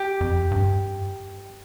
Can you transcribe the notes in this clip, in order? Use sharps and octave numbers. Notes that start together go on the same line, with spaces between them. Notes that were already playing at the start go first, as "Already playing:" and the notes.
Already playing: G4
F2
G2